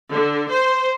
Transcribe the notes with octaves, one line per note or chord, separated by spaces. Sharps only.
D3
C5